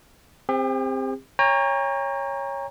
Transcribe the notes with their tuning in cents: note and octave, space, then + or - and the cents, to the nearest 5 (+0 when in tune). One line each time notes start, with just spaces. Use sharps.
C4 +0 G4 +45
C#5 +0 G5 +45 A#5 +0